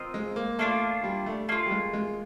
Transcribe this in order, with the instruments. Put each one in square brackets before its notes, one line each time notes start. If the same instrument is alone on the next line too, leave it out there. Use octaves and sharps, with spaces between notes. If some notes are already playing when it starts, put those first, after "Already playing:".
Already playing: [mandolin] C4 F4 A#4 D#5
[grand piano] G#3
A#3
[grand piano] A3 [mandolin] A#3 D4 F4
[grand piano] G3
A3
[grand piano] A3 [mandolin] A#3 D4 F4
[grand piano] G3
G#3
G#3